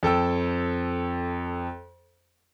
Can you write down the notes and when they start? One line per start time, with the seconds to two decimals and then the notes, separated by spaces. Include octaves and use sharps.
0.03 F2 A4 G5 E6